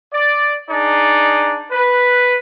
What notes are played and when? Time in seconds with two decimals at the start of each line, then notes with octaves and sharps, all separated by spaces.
0.12 D5
0.70 D4 D#4 G#4 D5
1.71 B4